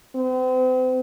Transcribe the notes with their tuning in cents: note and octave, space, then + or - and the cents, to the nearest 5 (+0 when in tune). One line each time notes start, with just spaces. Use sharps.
C4 -40